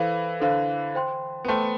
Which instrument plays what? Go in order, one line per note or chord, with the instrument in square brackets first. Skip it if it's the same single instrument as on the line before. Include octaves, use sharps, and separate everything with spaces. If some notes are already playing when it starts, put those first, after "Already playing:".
Already playing: [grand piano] E3 [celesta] A4 C5 F5
[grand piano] D3 [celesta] A4 C5 F5
[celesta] C5 G5 C6
[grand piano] B3
[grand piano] A3 [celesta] C5 G5 C6